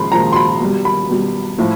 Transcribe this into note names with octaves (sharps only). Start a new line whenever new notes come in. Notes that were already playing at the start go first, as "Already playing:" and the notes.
Already playing: A#2 F3 G#3 B5 C6
A#2 F3 G#3 A#5
C6
B5
B2 G3
B5
B2 G3
A2 F3